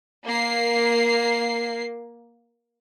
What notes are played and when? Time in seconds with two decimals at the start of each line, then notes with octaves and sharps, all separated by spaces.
0.25 A#3 C7